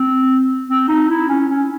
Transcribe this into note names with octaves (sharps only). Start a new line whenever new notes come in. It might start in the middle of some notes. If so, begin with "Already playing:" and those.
Already playing: C4
C4
D#4
E4
C#4
C#4